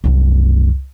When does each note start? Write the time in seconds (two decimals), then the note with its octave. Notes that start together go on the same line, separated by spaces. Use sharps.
0.04 C2 F#2